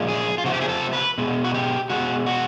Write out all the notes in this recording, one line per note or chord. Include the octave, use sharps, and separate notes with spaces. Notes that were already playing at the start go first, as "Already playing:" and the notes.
Already playing: A#2 F3 G#3
G#4
F4
C3 F3 A3 F#4
G4
G#4
A4
B4
B2 G#3
F#4
G4
B2 G#3 F#4
F#4